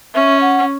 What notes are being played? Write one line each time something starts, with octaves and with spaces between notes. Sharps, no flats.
C#4 E5
F#5